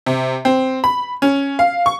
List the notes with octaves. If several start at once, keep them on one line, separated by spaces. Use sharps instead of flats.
C3
C4
B5
C#4
F5
C#6